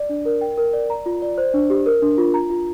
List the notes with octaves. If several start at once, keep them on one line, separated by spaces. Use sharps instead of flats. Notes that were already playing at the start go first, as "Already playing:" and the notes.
Already playing: D5
D4
A#4
G5
A#4
D5
A#5
F4
D5
C5
D4
G4
A#4
D4
F4
A#5
F4